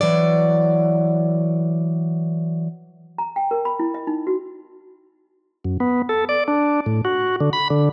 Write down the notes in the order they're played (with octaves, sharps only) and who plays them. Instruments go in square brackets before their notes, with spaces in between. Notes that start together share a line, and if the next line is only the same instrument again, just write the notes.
[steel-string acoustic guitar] E3 F#3 D5
[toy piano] A#5
G5
A#4
B5
E4
D#5
D#4
F#4
[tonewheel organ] F#2
B3
A4
D5
D4
A2
F#4
D3
B5
D3